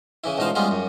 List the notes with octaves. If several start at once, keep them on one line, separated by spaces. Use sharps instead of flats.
C#3 E3 E4
C#2 B2 E3 D#4 C5 F5
G3 G#3 B3 C#4 F4
F#2